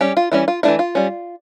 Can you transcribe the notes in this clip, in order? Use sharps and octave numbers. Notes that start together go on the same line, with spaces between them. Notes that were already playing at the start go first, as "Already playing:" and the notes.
G3 C#4 G4
F4
E3 G3 C#4 E4
F4
E3 A3 D4 E4
F4
G3 C#4